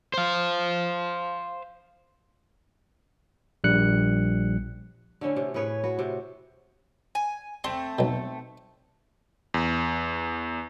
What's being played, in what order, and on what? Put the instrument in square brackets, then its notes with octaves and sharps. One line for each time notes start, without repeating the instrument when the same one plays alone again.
[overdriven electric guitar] C5 F5
[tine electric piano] A#1 G3 F#6 C#7
[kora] D3 A3 C#4 E4
C3
A2 G#4 B4 C#5
F#4 B4
C3
[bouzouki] G#5
[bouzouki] A3 C4 [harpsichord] C6
[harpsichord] B1 B2
[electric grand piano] E2